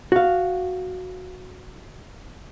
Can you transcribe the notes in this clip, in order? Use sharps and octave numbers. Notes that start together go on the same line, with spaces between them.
F#4 F5